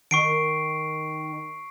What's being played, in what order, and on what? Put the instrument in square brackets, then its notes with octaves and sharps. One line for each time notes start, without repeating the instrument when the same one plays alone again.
[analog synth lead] D#3 [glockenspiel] C#6 C7 D7